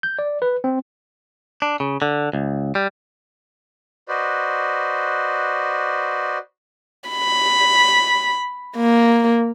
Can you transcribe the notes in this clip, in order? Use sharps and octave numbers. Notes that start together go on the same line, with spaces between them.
G6
D5
B4
C4
D4
C#3
D3
C#2
G3
F#4 B4 C5 D5 D#5
B5
A#3